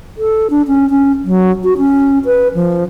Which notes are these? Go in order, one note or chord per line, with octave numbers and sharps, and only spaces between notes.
A4
D4
C#4
C#4
F#3
F#4
C#4
B4
F3